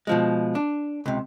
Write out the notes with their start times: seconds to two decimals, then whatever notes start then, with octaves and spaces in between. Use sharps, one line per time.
0.07 B2 F3 G#3
0.55 D4
1.06 C#2 C3